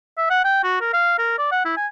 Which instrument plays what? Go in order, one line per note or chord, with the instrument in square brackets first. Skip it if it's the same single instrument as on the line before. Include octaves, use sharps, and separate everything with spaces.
[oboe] E5
F#5
G5
F#4
A#4
F5
A#4
D5
F#5
E4
G#5